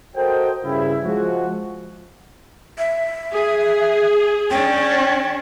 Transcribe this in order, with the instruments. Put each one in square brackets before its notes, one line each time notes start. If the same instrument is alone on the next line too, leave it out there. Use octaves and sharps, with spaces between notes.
[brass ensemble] F#4 A4 A#4 C5 D#5 G5
G2 C#3 E4
F3 G#3 F#4
[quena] E5
[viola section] G#4
[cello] C#4 D4 [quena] G5